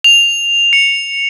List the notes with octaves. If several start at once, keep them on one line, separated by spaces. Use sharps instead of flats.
F7
C#7